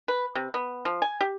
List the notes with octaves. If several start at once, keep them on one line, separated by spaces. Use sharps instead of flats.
B4
C3
B3
F3
G#5
G4